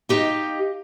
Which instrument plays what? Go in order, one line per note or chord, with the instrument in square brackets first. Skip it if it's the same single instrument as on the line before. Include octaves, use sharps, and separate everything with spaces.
[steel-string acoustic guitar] D#4 G4 D#5 F5